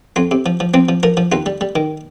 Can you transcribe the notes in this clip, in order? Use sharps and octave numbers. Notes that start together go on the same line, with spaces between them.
F2 F4
C3
F3
F3
F3 C4
F3
F3 A#4
F3
D#2 F4
G3
G3
D#3